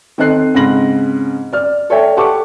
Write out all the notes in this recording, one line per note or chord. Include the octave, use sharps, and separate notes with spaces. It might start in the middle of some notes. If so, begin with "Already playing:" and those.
D#3 C4 A4 D#5 F#6 C7
G#2 C#3 C4 B5 A#6 F#7
D5 F6
A4 C#5 D5 E5 G5
G4 A4 F#5 A5 C#6 D6